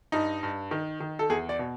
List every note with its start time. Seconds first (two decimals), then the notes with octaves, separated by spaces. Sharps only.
0.12 G2 D#4
0.43 G2
0.71 D#3
1.00 D#3
1.19 A4
1.30 E2 G#4
1.49 D5
1.59 B2